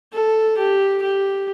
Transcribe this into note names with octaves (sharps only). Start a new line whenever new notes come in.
A4
G4
G4